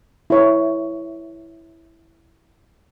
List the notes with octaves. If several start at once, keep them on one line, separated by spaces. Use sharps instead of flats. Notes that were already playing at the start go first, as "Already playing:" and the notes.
E4 C#5